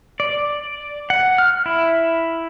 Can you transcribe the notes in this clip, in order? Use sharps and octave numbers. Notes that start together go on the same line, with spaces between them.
D5
F#5
F6
E4